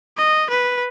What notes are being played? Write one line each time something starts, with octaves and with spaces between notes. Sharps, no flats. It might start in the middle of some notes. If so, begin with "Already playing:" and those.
D#5
B4